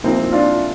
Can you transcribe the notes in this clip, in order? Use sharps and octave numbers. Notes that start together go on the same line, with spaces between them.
C2 A#2 F3 C4 D#4
D4 F4